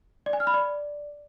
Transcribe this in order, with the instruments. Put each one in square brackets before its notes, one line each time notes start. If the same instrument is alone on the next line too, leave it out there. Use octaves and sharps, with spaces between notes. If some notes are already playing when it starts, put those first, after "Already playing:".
[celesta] D5
G#5
F6
B5
D5